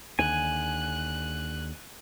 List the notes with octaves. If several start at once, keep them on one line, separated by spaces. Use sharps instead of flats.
D#2 D3 G#5 F#6